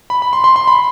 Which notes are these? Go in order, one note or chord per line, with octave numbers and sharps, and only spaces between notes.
B5
B5
C6
C6
C6
B5